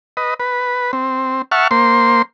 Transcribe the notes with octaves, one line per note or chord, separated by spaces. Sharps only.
B4 D#5
B4
C4
E5 F#5 A5 C#6 F6
A#3 C5 C6